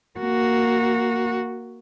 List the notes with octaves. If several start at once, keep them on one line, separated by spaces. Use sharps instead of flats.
A#3 F#4